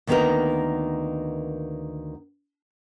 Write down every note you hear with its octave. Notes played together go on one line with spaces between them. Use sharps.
D2 D#3 A#3 B3 D#4 A#4